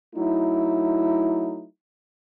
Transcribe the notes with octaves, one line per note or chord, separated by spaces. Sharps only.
F#3 A3 D#4 E4